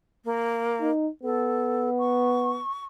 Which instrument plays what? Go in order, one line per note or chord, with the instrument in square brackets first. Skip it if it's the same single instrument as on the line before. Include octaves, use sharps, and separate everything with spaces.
[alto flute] A#3
[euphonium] D#4
[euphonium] B3 [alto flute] A4
[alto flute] C#6